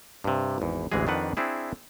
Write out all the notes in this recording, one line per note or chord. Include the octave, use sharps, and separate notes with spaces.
G2 C3
G#1 E2
A1 D2 E3 G#3 G#4
F2 D#3 D4 B4 F#5
C4 D4 E4 G#4